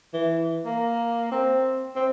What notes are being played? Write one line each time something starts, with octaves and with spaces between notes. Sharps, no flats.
E3
A#3
C4
C4